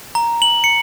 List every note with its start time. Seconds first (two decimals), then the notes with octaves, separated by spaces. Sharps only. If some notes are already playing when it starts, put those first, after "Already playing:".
0.15 A#5
0.42 F#7
0.64 C#7